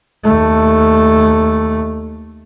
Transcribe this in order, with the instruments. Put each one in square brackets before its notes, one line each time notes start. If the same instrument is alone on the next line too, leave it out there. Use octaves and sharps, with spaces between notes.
[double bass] D#2 A3